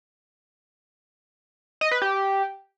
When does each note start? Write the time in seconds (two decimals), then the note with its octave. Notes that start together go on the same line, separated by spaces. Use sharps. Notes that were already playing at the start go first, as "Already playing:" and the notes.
1.81 D#5
1.91 B4
2.02 G4